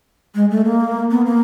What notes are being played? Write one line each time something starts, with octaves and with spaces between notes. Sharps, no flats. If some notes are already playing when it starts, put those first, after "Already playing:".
G#3
A3
A#3
B3
A#3